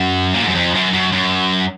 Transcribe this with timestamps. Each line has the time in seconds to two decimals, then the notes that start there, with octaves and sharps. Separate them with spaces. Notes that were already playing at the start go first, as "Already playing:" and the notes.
Already playing: F#2
0.34 A#2
0.42 G#2
0.48 F#2
0.55 F2
0.75 F#2
0.93 F#2
1.12 F#2